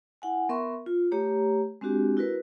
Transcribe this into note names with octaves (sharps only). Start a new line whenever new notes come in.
E4 F#5 G#5
B3 A#4 E5 C6 C#6
F4
A3 G4 C#5 A#5
G#3 C4 D4 F#4 G4
E4 F#4 A#4 B4